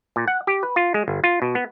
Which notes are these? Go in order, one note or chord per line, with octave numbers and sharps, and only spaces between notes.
A#2
F#5
G4
B4
F4
G#3
G1
F4
B2
B3